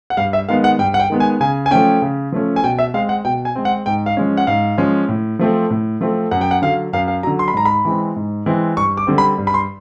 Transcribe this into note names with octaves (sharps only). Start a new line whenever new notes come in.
F#5
G2 F5
E5
D#3 G#3 B3 F5
F#5
G2 G5
F#5
G5
D#3 G#3 B3
G#5
C#3 G#5
G#5
F3 A3 C#4 G5
C#3
F3 A3 C#4
G#5
B2 G5
E5
G#3 C4 F5
F#5
B2 G5
G#5
G#3 C4
F#5
G#2 G5
F5
F3 G#3 C#4
F#5
G#2 F5
F3 G#3 C#4
A2
F3 A3 C4
A2
F3 A3 C4
F#2 F#5
G5
F#5
D3 F#3 F5
F#2 F5
F5
D3 F#3 A#5
C6
B5
G#2 A#5
B5
E3 G#3 C4
G#2
E3 G#3 C4
G2 C#6
D6
D3 G3 C4
B5
G2
B5
C6